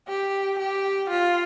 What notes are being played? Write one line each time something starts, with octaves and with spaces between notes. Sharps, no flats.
G4
G4
F4